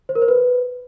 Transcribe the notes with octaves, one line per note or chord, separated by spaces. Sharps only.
C5
A#4
C5
B4